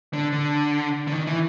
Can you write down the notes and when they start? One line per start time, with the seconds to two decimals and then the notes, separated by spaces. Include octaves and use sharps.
0.13 D3
0.32 D3
1.07 D3
1.12 D#3
1.27 E3